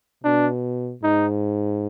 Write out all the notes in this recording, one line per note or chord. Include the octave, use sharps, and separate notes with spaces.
B2 D4
G#2 D#4